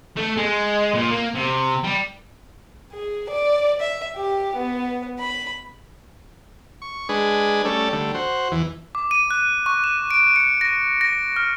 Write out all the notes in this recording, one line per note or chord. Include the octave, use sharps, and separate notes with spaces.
A3
G#3
A#2
A#3
C3
G3
G#4
D5
E5
G4
B3
B5
C#6
G#3 D4 G#4 B4
G3 A3 C#4 A4 D5
D3 G3 A3
F#4 C5
E2 E3
D6
D#7
F#6
C#6
E7
D7
C#7
A#6
A#6
F6